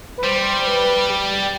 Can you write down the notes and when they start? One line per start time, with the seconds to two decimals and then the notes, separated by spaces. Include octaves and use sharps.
0.18 B4
0.23 G3 C5
0.61 C5
0.67 B4
1.10 G4